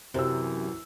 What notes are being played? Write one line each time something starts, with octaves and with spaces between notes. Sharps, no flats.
F#2 C3 E3 C5 E6